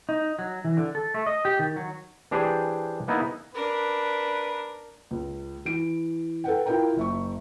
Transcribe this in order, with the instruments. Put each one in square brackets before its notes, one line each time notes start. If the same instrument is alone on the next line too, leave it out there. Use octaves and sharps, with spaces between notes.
[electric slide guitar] D#4
F#3
E3
D3
A4
A3
D#5
G4
D#3
F#3
[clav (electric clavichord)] E3 D4 G4 G#4 C5 D5
A#3 B3 D#4 E4
[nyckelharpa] D4 A#4 [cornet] B4
[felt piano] C#2
E3 D7
A4 B4 F#5 G5
E4 F4 A#4 G5 A#5
F#1 E5 C#6